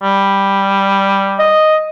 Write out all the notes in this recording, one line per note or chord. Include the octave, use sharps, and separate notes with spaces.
G3
D#5